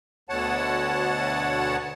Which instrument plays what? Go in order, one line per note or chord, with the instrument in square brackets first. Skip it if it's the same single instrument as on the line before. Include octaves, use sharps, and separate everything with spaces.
[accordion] D2 B2 D3 C#5 F#5 A5